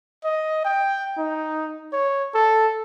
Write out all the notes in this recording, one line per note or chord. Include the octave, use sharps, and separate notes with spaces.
D#5
G5
D#4
C#5
A4